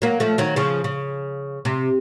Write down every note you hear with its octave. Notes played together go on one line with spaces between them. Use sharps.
F#3 A#3
F3 A3
D#3 F#3
C#3 F3
C#3
C3